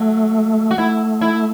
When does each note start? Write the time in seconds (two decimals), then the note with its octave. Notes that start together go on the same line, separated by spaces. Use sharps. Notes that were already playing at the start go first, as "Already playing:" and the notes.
Already playing: F#3 A3
0.71 F#4
0.78 A3 E4
1.21 E4